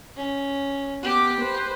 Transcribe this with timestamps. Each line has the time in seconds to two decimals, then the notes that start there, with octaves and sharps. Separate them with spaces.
0.16 C#4
1.03 B3 G4 D6
1.41 B4 C5